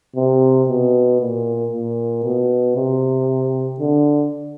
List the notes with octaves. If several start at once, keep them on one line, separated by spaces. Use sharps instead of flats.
C3
B2
A#2
A#2
B2
C3
D3